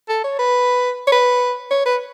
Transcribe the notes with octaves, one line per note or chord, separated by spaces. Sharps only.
A4
C#5
B4
C#5
B4
C#5
B4